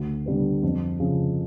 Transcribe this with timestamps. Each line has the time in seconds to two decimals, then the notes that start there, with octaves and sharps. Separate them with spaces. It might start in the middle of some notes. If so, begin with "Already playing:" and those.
Already playing: D2
0.26 D3 G3 B3
0.63 F2
1.00 C#3 F3